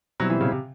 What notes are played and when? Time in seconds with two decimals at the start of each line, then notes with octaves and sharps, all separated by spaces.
0.20 B2 F#3 G3 C4 E4
0.30 E3
0.41 C#3
0.51 C3